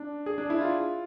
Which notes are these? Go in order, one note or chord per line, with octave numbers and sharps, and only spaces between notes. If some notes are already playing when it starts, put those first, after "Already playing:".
Already playing: D4
G#4
D4
E4
F4